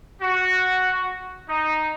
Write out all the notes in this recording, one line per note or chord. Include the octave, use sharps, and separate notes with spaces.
F#4
D#4